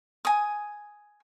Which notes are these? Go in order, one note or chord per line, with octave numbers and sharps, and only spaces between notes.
G#5 D#6